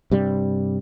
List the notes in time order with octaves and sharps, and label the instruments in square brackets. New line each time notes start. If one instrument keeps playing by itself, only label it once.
[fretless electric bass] G2 C3 G3